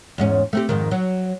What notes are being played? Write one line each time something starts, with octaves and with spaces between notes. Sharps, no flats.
E2 G#2 C#4
A3 C4 G4
F2 G#2 D#3
F#3